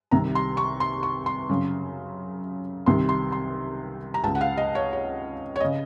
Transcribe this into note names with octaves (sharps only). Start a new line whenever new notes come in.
C2 C3 D#3 A#5
C6
C#6
C6
C#6
C6
F#2 C#3
C2 C3 D#3 C6
C6
C6
A#5
C#2 C#3 A5
F#5
F5
D#5
C#5
C#5
C#5
C#3 D#5